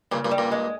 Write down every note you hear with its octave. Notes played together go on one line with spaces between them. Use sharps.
G2 A#2 C#3
G2 A#2
G3
G2 A#2
G#3